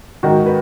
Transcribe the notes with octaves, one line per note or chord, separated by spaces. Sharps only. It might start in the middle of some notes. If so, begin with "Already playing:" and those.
G#2 D#3 F#4
B4